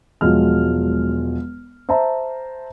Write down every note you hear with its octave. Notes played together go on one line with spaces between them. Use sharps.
E1 F3 F#3 G#3 F6
C5 E5 A5 A#5